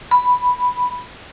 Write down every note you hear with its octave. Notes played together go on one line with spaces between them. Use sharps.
B5